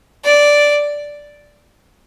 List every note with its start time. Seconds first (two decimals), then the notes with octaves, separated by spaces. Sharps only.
0.24 D5